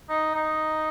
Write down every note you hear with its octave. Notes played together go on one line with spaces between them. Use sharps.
D#4
D#4